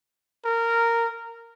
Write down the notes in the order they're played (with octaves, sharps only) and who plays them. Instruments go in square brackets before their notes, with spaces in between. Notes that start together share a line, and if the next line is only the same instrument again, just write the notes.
[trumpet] A#4